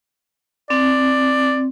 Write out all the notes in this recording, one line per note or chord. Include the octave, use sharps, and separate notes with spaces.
C4 D5